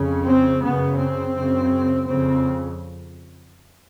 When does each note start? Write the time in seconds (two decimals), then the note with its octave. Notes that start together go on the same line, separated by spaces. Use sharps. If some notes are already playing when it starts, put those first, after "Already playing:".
Already playing: F2 C#3
0.24 C4
0.60 F#2 C#3 B3
0.96 C4
1.34 F#2 C#3
2.05 F2 C#3 C4